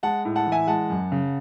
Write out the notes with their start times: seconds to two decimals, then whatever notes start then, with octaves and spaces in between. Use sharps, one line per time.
0.03 G#3 F#5 A5
0.25 A2
0.36 F#5 A5
0.47 E3
0.52 E5 G#5
0.67 G#3 F#5 A5
0.90 F#2
1.12 C#3